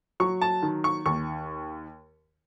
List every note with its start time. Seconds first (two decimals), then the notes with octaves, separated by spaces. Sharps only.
0.20 F#3 C#6
0.42 A5
0.63 D#3
0.84 C#6
1.05 D#2 C#6